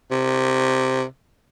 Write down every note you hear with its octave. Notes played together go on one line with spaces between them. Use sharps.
C3